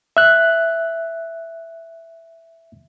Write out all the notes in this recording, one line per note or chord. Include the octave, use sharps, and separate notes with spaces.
E5 F#6